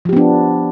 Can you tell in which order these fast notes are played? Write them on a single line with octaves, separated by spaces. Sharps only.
F3 G4 B3 D4